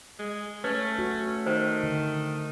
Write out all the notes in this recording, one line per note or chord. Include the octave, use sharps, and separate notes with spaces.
G#3
A3 C#4 B4
F#4
D#3 C5
D3